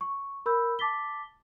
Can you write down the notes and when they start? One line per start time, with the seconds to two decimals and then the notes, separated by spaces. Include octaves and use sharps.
0.01 C#6
0.46 A#4 B5 E6 G6
0.79 A5 D6 A6 B6 G7